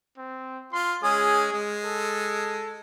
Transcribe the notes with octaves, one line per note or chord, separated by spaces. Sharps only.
C4
F4 C6
G#3 C#4 G#4 D#6
G#3
A4